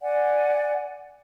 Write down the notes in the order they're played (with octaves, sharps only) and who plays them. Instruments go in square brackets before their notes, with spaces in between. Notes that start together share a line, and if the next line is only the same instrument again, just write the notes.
[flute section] D5 F#5 G#5